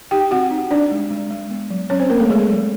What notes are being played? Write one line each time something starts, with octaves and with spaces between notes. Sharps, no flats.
D#4 G4 G5
C4 F#4 F#5
D#4
D4 D#4 D5
G#3
G#3
G#3
B3
F#3
F#3 C#4 C#5
C4 C5
A#3 B3 A#4
A3 A4
G#3 B3 G#4
F#3